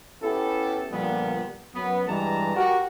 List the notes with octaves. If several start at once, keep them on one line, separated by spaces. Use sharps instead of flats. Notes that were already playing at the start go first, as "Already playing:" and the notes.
B3 C#4 E4 G4 A4
A#2 D3 F3 G3 B3
F#2 B3
G2 E3 G3 G#3 A5 A#5
F#4 G4 A#4